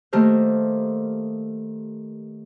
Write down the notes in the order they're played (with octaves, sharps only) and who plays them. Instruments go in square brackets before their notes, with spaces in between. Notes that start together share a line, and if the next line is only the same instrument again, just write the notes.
[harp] D#3 A3 A#3 G4 A#4 C5